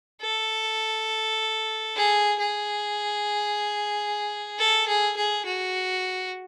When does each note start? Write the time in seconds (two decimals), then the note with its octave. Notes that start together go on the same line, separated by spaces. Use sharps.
0.22 A4
1.96 G#4
2.39 G#4
4.59 A4
4.88 G#4
5.17 G#4
5.46 F#4